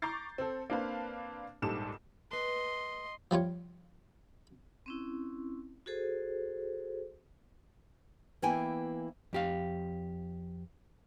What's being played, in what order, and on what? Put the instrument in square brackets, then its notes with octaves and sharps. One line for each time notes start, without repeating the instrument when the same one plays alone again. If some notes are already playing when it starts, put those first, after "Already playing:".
[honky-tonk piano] A#5 C#6 D6 G6 A6 C7
C4 A4
A#3 C4 D4 B4 F5 A5
A#1 G#2 G3 A4 D6 E7
[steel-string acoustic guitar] B4 A5 [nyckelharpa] D#5 C6
[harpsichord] F3 G3 F4 C#5
[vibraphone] C4 C#4 E4
F#4 G#4 A4 C5
[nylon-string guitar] E3 A#3 B3 E4 G5 G#5
[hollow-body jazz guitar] F2 G4 F5